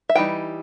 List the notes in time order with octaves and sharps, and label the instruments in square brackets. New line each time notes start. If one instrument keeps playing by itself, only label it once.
[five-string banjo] E5
E3 G3 D#4 G5